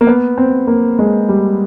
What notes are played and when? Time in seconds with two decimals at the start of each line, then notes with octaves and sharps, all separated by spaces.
0.01 A#3
0.07 B3
0.38 C4
0.67 A#3
0.99 G#3
1.29 G3